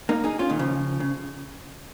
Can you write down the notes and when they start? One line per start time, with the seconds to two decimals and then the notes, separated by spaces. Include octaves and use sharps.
0.09 A#3 D#4
0.24 D#4 G#4
0.39 C#4 F4
0.49 A#2 D#3
0.59 C#3 F3
1.00 C#3